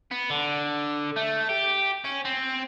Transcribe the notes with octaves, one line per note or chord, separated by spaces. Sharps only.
B3
D3
A3
G4
C#4
C4